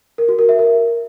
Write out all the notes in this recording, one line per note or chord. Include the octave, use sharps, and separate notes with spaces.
A#4
F#4
A#4
E5
A#4